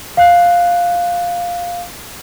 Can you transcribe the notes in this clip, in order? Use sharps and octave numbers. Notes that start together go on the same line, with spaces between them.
F5 F#6